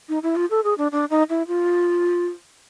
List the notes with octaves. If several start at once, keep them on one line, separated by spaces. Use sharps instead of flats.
D#4
E4
F4
A4
G#4
D4
D4
D#4
E4
F4